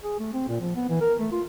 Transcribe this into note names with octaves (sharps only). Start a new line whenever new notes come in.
G#4
A3
C4
A#2
F3
B3
E3
A#4
A3
F4